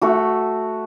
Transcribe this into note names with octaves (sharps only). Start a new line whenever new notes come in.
A3 F#4